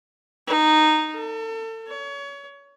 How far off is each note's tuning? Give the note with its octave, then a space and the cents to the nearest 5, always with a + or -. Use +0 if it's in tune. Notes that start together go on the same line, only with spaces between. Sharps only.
D#4 -10
A4 +35
C#5 +30